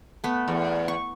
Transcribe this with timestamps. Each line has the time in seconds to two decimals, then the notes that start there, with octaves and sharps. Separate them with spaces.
0.24 A3 B3
0.48 E2
0.88 C#6